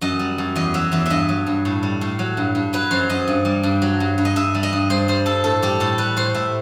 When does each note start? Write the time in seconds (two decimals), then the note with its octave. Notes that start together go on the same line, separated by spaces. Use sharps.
0.01 F#2 D#5
0.19 G3
0.38 F#2
0.56 E2 D#5
0.74 F#3 E5
0.92 E2 E5
1.06 G2 D#5 E5
1.29 F#3
1.46 G2
1.65 A2
1.83 G3
2.01 A2
2.19 F#3
2.37 G2
2.55 G2
2.73 F#3 B4
2.91 F#2 C5
3.09 F#2 D#5
3.27 G2
3.45 G3
3.63 G2
3.82 F#3
4.00 G2
4.18 G2
4.25 D#5
4.36 G2 E5
4.55 G3
4.63 D#5
4.73 G2
4.90 G2 C5
5.08 G3 C5
5.26 G2 A4
5.44 A2 A4
5.62 G3 G4
5.80 A2 A4
5.98 G3 B4
6.17 A2 C5
6.34 A2 E5